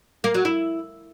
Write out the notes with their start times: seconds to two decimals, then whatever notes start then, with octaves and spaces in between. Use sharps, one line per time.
0.24 A#3
0.34 F#3
0.45 E4